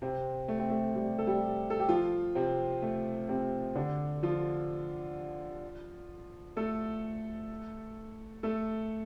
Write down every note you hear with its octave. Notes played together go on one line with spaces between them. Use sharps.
C3 C4
A3
C4
A3
G3
A4
G3 G4
A4
G4
F3 F4
C3 C4
A3
C3 C4
D3 D4
F3 F4
A3 A4
A3 A4